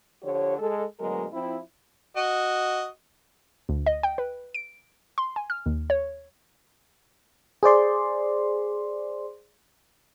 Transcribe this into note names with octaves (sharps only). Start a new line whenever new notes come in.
D3 F3 G4 C#5
G#3 A4
D2 B2 F#3 G#3 A#4
F3 C4 E4
F#4 D#5
D2
D#5
G5
B4
D7
C6
G#5
F6
D#2
C#5
G#4 C5 D5 C6